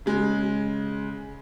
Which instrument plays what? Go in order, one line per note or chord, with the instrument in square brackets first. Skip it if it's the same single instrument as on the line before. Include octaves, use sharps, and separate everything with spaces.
[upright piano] C#3 G#3